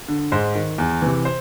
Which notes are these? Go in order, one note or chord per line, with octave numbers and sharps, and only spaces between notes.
D3
G#2 C5
D#3
E2
C3 E3
C5